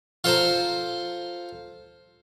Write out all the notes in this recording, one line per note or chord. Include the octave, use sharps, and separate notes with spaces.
F4 A4 C5 A#5